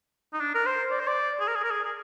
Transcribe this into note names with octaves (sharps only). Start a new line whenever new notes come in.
D#4
D4
A#4
C5
D5
C5
D5
G#4
A#4
G#4
A#4
G#4
G#4